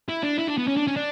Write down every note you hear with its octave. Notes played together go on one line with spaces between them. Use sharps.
E4
D4
E4
D4
B3
C#4
D4
C#4
D4